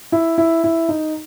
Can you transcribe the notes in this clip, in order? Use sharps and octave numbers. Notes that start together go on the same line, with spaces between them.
E4
E4
E4
D#4